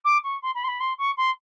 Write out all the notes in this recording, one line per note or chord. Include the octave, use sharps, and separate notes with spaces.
D6
C#6
C6
B5
C6
B5
C6
C#6
C6